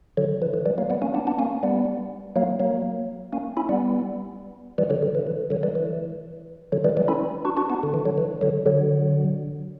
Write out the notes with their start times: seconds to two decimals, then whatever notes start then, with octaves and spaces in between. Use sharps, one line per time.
0.17 D3 F#3
0.42 E3
0.54 E3
0.66 E3 G3
0.78 F#3 A#3
0.90 G3 B3
1.02 A#3 C#4
1.14 B3 D4
1.27 B3 D4
1.39 A#3 C#4
1.63 G3 B3
2.36 F#3 A#3
2.60 F#3 A#3
3.33 A#3 C#4
3.57 C#4 E4
3.69 G3 B3
4.78 E3 G3
4.90 D3 F#3
5.03 D3
5.15 E3
5.27 E3
5.50 D3 F#3
5.63 E3 G3
5.75 E3
6.72 D3 F#3
6.84 E3 G3
6.97 E3 G3
7.08 C#4 E4
7.45 D4 F#4
7.57 D4 F#4
7.70 B3 D4
7.83 D3
7.94 E3
8.05 D3 F#3
8.18 E3
8.41 D3 F#3
8.66 D3 F#3